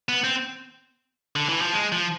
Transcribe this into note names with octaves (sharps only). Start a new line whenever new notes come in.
B3
C4
D3
E3
F3
G#3
F3